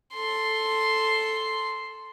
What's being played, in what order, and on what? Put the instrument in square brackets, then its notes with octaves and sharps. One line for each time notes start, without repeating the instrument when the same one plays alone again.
[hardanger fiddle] A4 C6